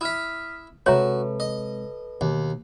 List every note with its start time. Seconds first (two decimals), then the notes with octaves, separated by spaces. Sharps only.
0.01 E4 E5 D#6 F6 B6
0.86 C3 G#3 F#4 A4 B4 C#5 E5 A#5
1.40 D#5
2.21 D#2 B2